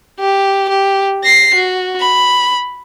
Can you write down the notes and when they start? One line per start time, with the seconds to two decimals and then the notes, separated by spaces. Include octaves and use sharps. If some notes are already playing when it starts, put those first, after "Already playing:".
0.20 G4
0.69 G4
1.24 A#6 C7
1.55 F#4
2.00 B5